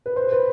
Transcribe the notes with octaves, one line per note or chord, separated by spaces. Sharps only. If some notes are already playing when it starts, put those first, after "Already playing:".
B4
C5
B4